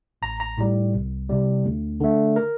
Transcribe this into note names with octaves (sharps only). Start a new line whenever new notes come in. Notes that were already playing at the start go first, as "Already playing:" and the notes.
A1 A#5
A#5
A2 G3
C2
C3 G3
D2
D3 A3
A#4